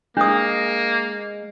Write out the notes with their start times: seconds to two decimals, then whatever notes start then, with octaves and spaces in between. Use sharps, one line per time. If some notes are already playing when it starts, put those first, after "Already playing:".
0.17 G#3 A#3 D4 D#6